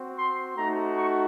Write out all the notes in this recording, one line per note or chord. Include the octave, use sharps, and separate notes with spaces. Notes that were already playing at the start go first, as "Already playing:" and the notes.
Already playing: C4 F#4
C6
A3 D#4 F#4 A#5
C#6